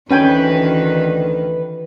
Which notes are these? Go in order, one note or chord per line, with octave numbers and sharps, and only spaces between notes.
D2 D#3 E3 C#4 B4 G5 G#5